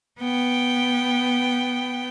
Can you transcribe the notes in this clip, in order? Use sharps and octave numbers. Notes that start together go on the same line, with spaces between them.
B3 G5